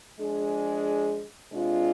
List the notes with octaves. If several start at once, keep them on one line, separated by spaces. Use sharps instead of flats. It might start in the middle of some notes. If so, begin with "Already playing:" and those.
F3 G#3 D4 G#4
C3 G#3 D4 F4